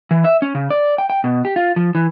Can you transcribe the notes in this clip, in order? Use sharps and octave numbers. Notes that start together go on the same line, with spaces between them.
E3
E5
C#4
C#3
D5
G5
G5
B2
G4
F4
F3
E3